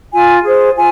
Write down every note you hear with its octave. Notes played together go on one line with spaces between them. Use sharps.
F4 G#5
G#4 C5
F4 G#5